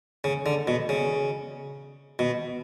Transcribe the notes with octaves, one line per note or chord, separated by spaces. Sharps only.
C#3
D3
B2
C#3
B2